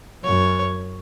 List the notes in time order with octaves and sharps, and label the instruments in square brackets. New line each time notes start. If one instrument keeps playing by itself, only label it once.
[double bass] F#2 [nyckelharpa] C#5